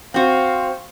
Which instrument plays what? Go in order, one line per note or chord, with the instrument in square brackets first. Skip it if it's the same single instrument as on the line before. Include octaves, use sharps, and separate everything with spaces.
[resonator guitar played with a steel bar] C4 F#4 [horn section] C5 F5